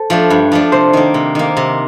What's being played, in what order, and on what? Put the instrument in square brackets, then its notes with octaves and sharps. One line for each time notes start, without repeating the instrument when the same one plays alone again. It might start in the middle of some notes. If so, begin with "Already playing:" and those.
Already playing: [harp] A4 C5
[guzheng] F3 A3 D4
G2
F3 A3 D4
[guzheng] C3 [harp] C5
[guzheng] D#3 A#3
C3
D#3 A#3
C3